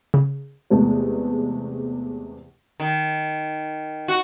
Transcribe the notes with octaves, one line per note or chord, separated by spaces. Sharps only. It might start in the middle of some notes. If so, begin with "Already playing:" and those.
C#3
E2 C3 G#3 A3 B3
D#3
F#4